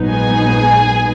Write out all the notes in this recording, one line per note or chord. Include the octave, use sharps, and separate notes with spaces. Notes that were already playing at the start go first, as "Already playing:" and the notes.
Already playing: A#1 G#2 F#3 B3 D#4
G#4 G#5